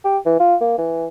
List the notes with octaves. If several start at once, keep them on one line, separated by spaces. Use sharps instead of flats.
G4
E3
F4
A#3
E3